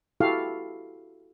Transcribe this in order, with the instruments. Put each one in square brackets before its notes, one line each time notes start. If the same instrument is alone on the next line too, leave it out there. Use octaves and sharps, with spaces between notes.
[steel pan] E4 F#4 G4 A4 F5